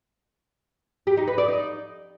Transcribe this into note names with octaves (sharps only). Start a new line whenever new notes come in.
G4
D#4
B4
D5
D#4